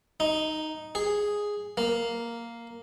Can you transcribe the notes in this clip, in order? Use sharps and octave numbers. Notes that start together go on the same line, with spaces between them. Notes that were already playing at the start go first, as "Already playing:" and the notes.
D#4
G#4
A#3